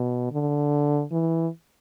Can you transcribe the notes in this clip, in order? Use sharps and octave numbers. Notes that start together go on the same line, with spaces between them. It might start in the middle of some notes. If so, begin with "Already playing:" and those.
Already playing: B2
D3
E3